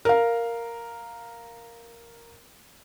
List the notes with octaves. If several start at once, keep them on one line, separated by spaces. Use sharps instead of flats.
A#4 F5